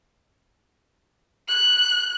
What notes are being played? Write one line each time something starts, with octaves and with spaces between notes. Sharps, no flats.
F#6